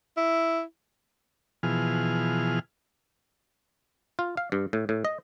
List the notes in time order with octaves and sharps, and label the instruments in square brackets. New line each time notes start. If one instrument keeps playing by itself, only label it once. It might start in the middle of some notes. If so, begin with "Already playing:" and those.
[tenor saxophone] E4
[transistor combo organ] B2 E3 F3 G#4 F6
[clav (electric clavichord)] F4
F5
G2
A2
A2
D#5